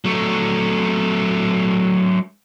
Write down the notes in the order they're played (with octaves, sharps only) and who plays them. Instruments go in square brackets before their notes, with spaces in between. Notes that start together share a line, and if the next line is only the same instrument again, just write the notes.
[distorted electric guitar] F#3 A3